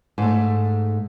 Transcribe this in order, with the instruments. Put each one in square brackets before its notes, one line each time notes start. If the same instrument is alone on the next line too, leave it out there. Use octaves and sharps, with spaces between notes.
[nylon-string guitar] G#2 A3